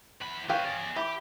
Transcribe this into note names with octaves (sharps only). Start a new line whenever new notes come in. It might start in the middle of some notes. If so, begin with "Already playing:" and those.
E2 B5
C#4 F4 B4 F5 G5
G#4 D5
E3 G4